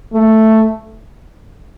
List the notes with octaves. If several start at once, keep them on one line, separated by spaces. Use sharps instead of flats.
A3